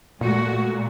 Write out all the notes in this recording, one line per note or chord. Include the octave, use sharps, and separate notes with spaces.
A#2 G#3 A3 F#4